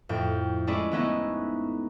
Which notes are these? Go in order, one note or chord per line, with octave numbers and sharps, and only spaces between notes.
F2 A2 G5
G#3 A3 C#4 E4 G#4 D5
G#3 A3 B3 C#4 D#4 E4